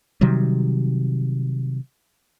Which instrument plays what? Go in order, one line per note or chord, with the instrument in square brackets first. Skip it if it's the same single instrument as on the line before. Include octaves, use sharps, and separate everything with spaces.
[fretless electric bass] C3 D#3 F#3 G3